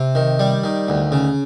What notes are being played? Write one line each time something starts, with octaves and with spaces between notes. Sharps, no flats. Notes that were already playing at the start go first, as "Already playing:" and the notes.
Already playing: C3
D#3
G3
D#3
D2
C#3